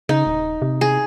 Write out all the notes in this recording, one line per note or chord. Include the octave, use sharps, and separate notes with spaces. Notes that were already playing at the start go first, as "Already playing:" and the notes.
C#3 D#4
D#1
C3
G#4